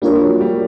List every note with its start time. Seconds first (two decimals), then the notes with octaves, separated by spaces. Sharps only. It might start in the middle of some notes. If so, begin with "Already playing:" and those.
0.02 G3 A#3 D4 F4 A#4 C#5
0.22 F#3
0.41 G3